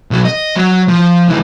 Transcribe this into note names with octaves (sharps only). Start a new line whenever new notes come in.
B1 F#3
D#5
F#3
F3
C#2 E3